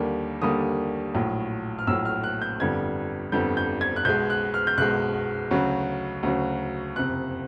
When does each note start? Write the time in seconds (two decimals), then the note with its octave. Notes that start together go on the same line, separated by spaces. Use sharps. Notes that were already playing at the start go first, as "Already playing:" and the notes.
Already playing: D#2 D3 G3 A#3
0.42 D#2 D3 G3 A#3 D#6
1.14 A#1 A2 F#3
1.79 F6
1.87 A#1 A2 F#3 E6
2.05 F6
2.24 F#6
2.42 G6
2.60 G1 F2 D3 G3 G#6
3.32 G1 F2 D3 G3 G6
3.57 G6
3.81 G#6
3.96 F#6
4.05 B1 B2 G#3 G6
4.30 F#6
4.54 F6
4.67 G6
4.78 B1 B2 G#3 F#6
5.51 D2 C#3 F#3
6.23 D2 C#3 F#3
6.96 F#1 F2 C3 F#6